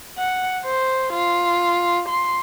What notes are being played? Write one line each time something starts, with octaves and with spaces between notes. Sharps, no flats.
F#5
C5
F4
C6